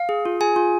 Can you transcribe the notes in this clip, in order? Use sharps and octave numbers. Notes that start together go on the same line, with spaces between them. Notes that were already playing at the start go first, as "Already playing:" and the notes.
Already playing: F5
G#4
F4
G#4 G#5
F4